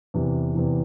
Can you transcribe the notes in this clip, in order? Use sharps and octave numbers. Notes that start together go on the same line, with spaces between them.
E2 C3 E3
E2 C3 E3